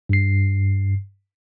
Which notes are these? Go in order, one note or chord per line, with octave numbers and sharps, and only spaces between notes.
G2 C7